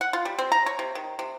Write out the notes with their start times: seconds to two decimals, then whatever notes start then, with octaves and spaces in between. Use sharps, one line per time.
0.01 F#5
0.13 F4
0.25 G3
0.39 C4
0.52 A#5
0.66 C#5
0.79 C3
0.95 D#3
1.19 C3